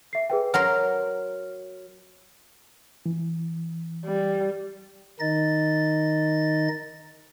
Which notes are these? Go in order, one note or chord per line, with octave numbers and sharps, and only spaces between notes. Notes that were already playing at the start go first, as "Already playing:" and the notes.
E5 C7
G#4 B4 G5
F#3 A#4 C6 F6
E3
G3
D#3 D#4 D#5 A6